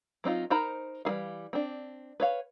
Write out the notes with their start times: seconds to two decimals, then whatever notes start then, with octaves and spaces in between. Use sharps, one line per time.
0.24 F#3 C4 D#4 F4
0.50 D#4 A#4 C5 A#5 B5
1.05 E3 G3 G#4 F5
1.53 C4 D4
2.20 B4 C#5 F5